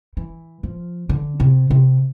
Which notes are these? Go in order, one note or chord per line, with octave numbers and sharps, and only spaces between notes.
E3
F3
D3
C3
C3